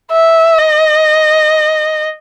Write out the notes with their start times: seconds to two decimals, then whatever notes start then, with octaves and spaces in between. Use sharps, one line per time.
0.12 E5
0.58 D#5